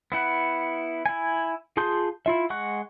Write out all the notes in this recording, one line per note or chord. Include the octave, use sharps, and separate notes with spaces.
B3 E4 F#5
E4 G#5
F4 G#4 A5 C6 G6
E4 F4 E5
G#3 F#5 C#6 F#6